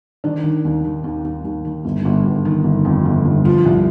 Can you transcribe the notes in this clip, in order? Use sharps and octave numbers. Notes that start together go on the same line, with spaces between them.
D#3 D4
D#3
D#2
D#3
D#2
D#2
D#2
D#3
G1
G1
G1
D#3
G1
F2
G1
G1
F3 F4
C2